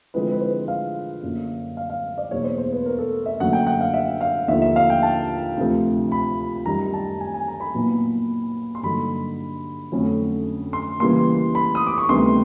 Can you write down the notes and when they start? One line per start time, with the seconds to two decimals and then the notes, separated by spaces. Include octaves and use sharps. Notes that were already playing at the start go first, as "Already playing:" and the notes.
0.14 D3 F3 G#3 C4 E4 B4
0.32 B4
0.41 C5
0.68 F5
1.23 F#2 D3 F#3 A#3 D4
1.77 F5
1.90 F5
2.18 D5
2.31 E2 B2 F#3 A#3 D#4 C#5
2.44 C5
2.58 C5
2.72 B4
2.86 A#4
2.98 A4
3.26 E5
3.40 F#2 D3 F#3 A#3 F#5
3.53 G5
3.67 F#5
3.81 F5
3.94 E5
4.21 F5
4.48 D#2 D3 F3 E5
4.62 E5
4.76 F5
4.90 G5
5.03 A5
5.57 D2 C3 F3
6.12 B5
6.66 F#2 D#3 G3 A#5
6.93 A5
7.20 G#5
7.34 G#5
7.48 A#5
7.60 B5
7.74 A#2 F#3 B3 D#4
8.75 C6
8.83 G2 D3 F#3 A#3 D#4 B5
9.92 F2 D3 F#3 A3 C#4
10.73 C6
11.00 C#3 E3 G3 A#3 C6
11.55 B5
11.75 D#6
11.87 D6
11.98 C#6
12.09 D2 C3 D#3 G3 B3 C6